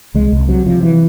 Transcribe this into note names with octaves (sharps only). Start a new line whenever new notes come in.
C2 G#3
C2
C3 F#3
C3 F3
E3